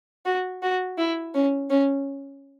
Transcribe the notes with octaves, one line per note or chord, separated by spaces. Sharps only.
F#4
F#4
E4
C#4
C#4